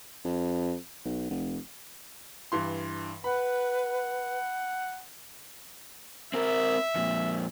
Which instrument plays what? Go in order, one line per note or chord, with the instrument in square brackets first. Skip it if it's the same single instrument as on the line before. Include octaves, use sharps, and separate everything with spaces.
[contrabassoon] F2
B1
F1
[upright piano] G2 E3 C6
[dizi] B4 [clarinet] F#5 [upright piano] B5
[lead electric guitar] C4 A#4 [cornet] E5
[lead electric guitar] F2 A#2